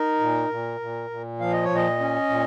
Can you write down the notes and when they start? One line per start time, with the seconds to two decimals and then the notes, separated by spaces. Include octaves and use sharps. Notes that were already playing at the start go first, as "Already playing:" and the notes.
Already playing: D#4 A#4
0.20 A#2
0.49 A#2
0.80 A#2
1.10 A#2
1.39 F3 F5
1.52 D#5
1.64 C#5
1.69 A#2
1.76 D#5
2.00 C#4
2.29 A#2